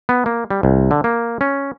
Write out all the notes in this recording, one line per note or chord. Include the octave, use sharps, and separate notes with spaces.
B3
A#3
G3
C2
D3
A#3
C#4